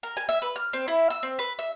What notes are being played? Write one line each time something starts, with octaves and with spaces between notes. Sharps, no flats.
A#4
G#5
E5
B4
F6
C4
E4
E6
C4
B4
E5